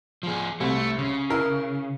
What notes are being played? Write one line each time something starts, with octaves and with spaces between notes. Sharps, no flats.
F3 G#4
C2 A3
C#3
E4 A#4